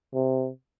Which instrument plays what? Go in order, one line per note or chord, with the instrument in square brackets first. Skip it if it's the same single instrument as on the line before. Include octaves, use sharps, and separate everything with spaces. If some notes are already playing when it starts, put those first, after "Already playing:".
[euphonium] C3